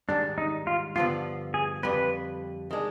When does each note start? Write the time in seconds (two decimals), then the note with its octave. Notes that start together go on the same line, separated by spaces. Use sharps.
0.09 G#2 D#3 G3 D4
0.38 D#4
0.67 F4
0.96 G2 D3 F3 B3 F4
1.54 G#4
1.83 F2 D3 G3 B4
2.71 D#3 G#3 D4